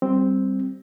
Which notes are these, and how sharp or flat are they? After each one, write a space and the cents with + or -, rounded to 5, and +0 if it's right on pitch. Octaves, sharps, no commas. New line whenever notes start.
G3 -5 C4 +0